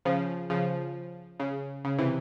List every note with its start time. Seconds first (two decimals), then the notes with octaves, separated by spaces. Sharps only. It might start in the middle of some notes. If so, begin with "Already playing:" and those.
0.05 C#3 F3
0.50 C#3 F3
1.40 C#3
1.84 C#3
1.98 C3 E3